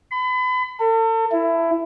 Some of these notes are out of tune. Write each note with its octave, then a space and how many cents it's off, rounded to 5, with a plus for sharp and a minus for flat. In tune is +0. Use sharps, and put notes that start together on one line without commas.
B5 +35
A4 +40
E4 +15